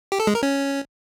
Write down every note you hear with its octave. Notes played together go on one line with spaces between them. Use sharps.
G4
A4
G#3
A#4
C#4